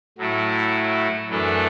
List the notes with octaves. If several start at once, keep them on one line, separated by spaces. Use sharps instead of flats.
A2 F#3 A3 E4
F#2 E3 A3 D4 A4